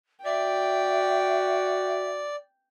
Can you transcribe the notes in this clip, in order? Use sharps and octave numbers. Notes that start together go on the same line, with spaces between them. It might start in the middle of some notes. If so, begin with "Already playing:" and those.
F#4 D5 E5 G5